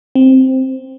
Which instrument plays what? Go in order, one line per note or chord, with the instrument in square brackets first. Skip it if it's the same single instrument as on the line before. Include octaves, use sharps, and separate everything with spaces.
[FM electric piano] C4